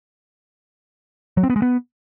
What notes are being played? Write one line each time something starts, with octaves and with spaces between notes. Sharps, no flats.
F#3
C4
B3
G#3
B3